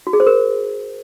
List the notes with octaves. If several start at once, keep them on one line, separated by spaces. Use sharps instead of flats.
F#4
G#4
C5
A#4